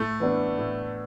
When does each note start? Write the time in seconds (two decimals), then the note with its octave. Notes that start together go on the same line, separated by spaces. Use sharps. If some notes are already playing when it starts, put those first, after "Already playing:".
Already playing: A2 A3
0.20 E3 B3 D4
0.58 A2